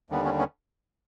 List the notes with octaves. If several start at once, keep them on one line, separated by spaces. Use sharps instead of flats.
D#2 D3 G3 B3
B3 C#4
B3 C#4